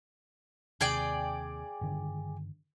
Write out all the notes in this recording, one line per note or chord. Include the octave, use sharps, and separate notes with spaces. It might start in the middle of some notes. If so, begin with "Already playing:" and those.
D#2 C3 G#4 D5 G5
G2 D3 D#3